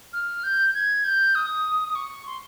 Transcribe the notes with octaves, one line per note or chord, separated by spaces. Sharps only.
F6
G6
G#6
G6
D#6
D#6
C#6
C6